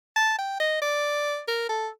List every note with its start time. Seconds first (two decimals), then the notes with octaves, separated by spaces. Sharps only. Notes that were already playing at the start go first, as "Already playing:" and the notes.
0.16 A5
0.38 G5
0.60 D#5
0.82 D5
1.48 A#4
1.69 A4